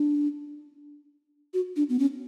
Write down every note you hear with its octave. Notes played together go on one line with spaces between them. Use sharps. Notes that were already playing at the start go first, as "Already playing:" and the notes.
Already playing: D4
F#4
D4
B3
C#4